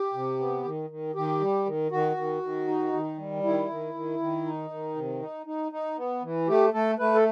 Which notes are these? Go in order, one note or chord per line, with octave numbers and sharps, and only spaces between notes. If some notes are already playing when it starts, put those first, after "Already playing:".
Already playing: G4
C3
B3
D#3
D#3
D#3 G4
G3
D#3
D#3 F#4
D#3
D#3
D#4
D#3
G3
D#3 E4
D#3
D#3
D#3
D#4
D#3
C3
D#4
D#4
D#4
B3
E3
A3 G4
A3 A4
A3 B4
A4